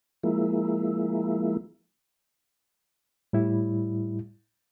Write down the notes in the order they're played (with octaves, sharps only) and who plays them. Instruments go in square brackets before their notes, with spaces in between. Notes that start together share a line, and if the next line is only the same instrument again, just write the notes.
[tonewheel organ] F3 G#3 A#3 E4
[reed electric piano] A2 G3 E4